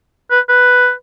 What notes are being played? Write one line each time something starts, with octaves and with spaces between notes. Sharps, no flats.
B4
B4